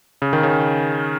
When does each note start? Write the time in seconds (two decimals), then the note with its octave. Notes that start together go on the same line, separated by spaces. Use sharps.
0.22 C#3
0.33 D#3
0.43 C#3